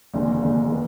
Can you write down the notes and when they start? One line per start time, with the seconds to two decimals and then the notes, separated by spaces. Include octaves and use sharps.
0.14 F1 D#2 D3 G#3
0.43 F1 D#2 D3 G#3
0.70 D#3 B3